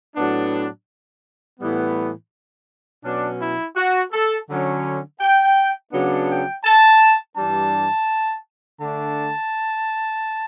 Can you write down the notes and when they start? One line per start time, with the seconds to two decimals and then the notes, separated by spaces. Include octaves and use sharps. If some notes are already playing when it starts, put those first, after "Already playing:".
0.16 A2 F#3 B3 D4
1.60 A2 E3 G3 B3
3.04 B2 F#3 C#4 D4
3.41 E4
3.76 F#4
4.12 A4
4.49 D3 F#3 C#4
5.21 G5
5.93 C#3 F#3 B3 D4
6.28 G5
6.65 A5
7.36 G2 E3 G3 D4 A5
8.80 D3 A3 D4 A5